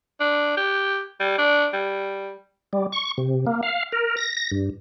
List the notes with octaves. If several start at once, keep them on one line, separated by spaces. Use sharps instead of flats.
D4
G4
G3
D4
G3
G3
C#6
C3
A#3
F5
A#4
A#6
A#6
G2